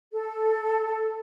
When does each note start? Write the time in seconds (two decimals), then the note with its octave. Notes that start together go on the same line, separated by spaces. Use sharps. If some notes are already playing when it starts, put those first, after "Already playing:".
0.12 A4